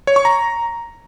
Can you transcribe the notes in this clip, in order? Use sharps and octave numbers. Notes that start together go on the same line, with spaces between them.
C#5
C#6
A#5